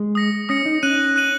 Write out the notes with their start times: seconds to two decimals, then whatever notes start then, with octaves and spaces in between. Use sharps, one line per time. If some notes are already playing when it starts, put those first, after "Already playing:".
Already playing: G#3
0.15 D#6 A#6 C#7
0.49 C#4 D#6 A#6 C#7
0.66 D#4
0.83 C#4 F#6 D#7 F#7
1.16 F#6 D#7 F#7